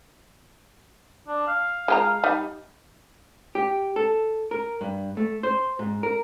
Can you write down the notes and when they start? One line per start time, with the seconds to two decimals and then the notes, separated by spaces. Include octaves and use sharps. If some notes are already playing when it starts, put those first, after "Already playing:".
1.28 D4
1.48 F5
1.88 G#3 F4 A#5
2.24 G3 D#4
3.55 G4
3.96 A4
4.51 A#4
4.81 G2
5.17 A3
5.43 C5
5.79 G#2
6.03 A#4